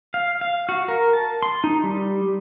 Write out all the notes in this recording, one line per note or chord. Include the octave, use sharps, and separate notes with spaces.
F5
F5
F#4
A#4
A5
C6
D#4
G3